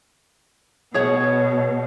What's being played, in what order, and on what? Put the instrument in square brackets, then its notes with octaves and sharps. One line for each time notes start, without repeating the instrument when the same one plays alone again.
[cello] B2 [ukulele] G#4 C#5 F#5